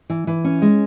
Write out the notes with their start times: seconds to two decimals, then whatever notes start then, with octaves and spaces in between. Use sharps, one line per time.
0.10 E3
0.27 E3
0.44 C#4
0.62 G#3